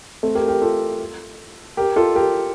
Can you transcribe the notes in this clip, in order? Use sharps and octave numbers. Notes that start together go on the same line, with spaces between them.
A3 C4
G4 A#4
G4 A#4
F4 A4
G4 A#4
F4 A4
G4 A#4